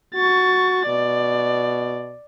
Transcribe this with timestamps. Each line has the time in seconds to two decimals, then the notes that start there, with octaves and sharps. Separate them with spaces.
0.15 F#4 C#6 A6
0.87 B2 D5